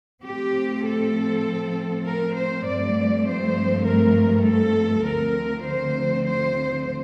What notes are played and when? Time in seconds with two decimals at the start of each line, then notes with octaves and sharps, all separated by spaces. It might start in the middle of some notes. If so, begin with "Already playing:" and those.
0.24 A2 F3 A3 C4 G4
0.84 A4
2.05 A#4
2.35 C5
2.65 G2 F3 A3 C4 D5
3.26 C5
3.85 A#4
4.46 A4
5.05 D2 D3 F3 C4 A#4
5.66 C5
6.26 C5